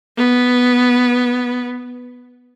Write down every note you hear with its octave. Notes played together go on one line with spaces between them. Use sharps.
B3